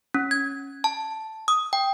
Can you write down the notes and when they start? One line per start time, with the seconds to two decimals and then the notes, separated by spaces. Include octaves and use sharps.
0.14 C#4
0.31 G#6
0.84 A5
1.48 D#6
1.73 G5